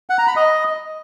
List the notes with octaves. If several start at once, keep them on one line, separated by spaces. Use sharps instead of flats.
F#5
A#5
B5
D#5